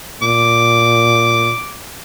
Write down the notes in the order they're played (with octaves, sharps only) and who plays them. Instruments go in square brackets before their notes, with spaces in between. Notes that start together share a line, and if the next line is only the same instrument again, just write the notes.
[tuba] A#2 [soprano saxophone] D6